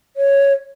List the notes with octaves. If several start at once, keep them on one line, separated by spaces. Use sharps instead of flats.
C#5